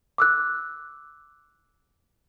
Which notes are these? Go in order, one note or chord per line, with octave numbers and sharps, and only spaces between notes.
D6 E6 F#6